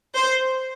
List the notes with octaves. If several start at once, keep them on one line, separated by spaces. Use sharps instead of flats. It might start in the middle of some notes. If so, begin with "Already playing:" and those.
C5